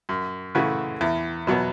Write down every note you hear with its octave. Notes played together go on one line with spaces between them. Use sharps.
F#2
C#3 E3 A3 F#4
E2
B2 F#3 B3